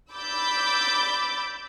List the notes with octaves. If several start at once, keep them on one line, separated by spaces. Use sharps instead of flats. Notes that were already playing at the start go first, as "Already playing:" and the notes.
B5 D6 E6 G6 A6